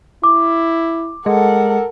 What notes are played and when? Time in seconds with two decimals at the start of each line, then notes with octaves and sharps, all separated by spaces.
0.24 E4 D6
1.26 G#3 A4 A#4 F#5